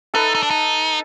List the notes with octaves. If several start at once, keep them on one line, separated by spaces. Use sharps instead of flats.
D#4 A4 B4
D#4
D4
D#4